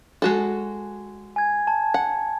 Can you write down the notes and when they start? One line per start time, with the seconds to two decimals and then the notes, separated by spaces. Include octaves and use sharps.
0.22 G#3 F#4 A4
1.36 G#5 G#6
1.67 A5
1.94 F#5